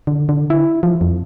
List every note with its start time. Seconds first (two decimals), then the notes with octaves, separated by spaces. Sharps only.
0.07 D3
0.29 D3
0.50 E4
0.83 F3
1.01 F2